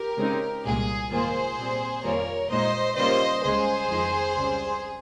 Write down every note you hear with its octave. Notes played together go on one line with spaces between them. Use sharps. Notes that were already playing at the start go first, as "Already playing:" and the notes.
Already playing: G4 A#4
C#3 G#3 C4 D#4
C2 A#2 G#3 G#4
G#2 D#3 A#3 F4 G#4 C5
A#2 G3 C4
F2 D#3 G3 A#3 F4 A#4 C#5
A#2 G#3 D#4 C5 D#5
C#3 G3 A#3 F4 C5 D#5
C#2 C#3 G#3 G#4 C5
F2 D#3 G#3 D#4
C#2 C#3 G3 C4